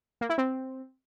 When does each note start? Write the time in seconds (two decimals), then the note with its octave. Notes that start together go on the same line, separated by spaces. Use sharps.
0.21 A#3
0.29 E4
0.38 C4